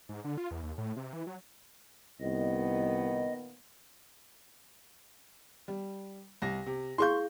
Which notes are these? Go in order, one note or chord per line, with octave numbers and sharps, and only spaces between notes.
G#2
D3
F4
E2
D#2
A2
C3
E3
F#3
C2 A#2 D#3 B3 D#5
G3
C2 A#6
C3
E4 G#4 F5 C6 C#6 G6